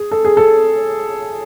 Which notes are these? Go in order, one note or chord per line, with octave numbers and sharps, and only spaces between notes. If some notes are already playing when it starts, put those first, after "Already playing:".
Already playing: G#4
A4
G#4
A4